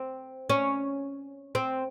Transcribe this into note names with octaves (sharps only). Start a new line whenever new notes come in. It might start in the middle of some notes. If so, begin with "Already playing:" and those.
Already playing: C4
C#4
C4